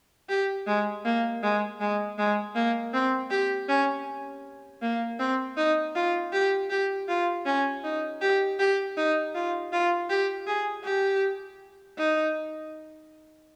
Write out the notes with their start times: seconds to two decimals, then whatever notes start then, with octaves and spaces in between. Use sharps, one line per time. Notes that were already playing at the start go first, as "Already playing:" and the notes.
0.29 G4
0.67 G#3
1.05 A#3
1.43 G#3
1.80 G#3
2.18 G#3
2.56 A#3
2.94 C4
3.31 G4
3.69 C#4
4.82 A#3
5.19 C4
5.57 D#4
5.95 F4
6.33 G4
6.70 G4
7.08 F4
7.46 C#4
7.84 D#4
8.21 G4
8.59 G4
8.97 D#4
9.35 F4
9.72 F4
10.10 G4
10.47 G#4
10.85 G4
11.98 D#4